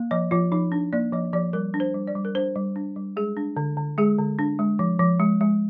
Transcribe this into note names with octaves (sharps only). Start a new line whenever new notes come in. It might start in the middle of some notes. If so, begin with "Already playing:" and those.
Already playing: A#3
F3 D#5
F3 F4
F3 D#4
D4
A#3 D5
F3 D#5
F3 D5
G3 A#4
D4
C5
G3
D5
G3
A#4
D4 C5
G3
D4
G3
G#3 G#4
D4
D3
D3
G#3 G#4
D3
D4
G#3
F3
F3
G#3
G#3